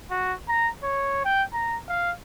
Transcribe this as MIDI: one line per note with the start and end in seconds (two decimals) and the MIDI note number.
0.10 0.34 66
0.48 0.70 82
0.83 1.24 73
1.25 1.43 79
1.53 1.78 82
1.89 2.11 77